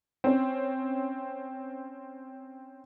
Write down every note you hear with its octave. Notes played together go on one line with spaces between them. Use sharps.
C4 C#4